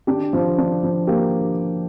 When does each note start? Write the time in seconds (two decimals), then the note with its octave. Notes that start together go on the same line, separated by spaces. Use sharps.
0.07 D4 G4
0.33 F3
0.58 D4
0.83 F3
1.07 A#3 G4